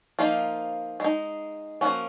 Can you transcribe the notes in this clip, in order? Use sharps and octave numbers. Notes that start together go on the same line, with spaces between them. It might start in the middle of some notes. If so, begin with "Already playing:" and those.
F3 A#3 D#4 F4
G#3 D#4
F3 A#3 C#4 F#4